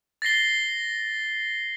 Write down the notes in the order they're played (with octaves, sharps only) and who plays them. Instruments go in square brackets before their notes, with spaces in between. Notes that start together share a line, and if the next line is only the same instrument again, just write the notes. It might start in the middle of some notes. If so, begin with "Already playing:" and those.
[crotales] A6 A#6 C7 G7